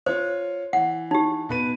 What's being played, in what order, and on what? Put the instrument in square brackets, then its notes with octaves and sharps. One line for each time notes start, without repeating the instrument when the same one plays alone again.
[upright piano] F4 C#5 [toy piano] C5
[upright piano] E3 [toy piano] F#5
[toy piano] D#4 G4
[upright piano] B2 B4 D#7